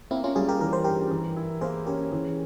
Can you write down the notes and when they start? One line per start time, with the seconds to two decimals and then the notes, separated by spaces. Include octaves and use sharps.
0.11 A#3 C4 E4
0.24 C#4 F4
0.36 G3 F4 G#4
0.49 G4 A#4
0.61 E3 A#4
0.73 C5
0.84 G2 G4 A#4
1.11 E3
1.36 E4
1.61 A#3 G#4 C5
1.86 C#4 G4 A#4
2.12 E3